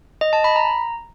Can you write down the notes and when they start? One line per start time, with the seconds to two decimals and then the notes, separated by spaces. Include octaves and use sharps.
0.21 D#5
0.33 A5
0.44 B5
0.56 A#5